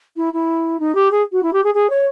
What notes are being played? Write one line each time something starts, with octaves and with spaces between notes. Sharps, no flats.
E4
E4
D#4
G4
G#4
F#4
E4
G4
G#4
G#4
C#5